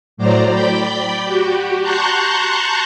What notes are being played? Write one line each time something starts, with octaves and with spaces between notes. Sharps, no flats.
A2 F#3 C5 D5 A#5
D5 G5 B5 G6
F#4 G4
A5 A#5 C6 C#6 F#6 G6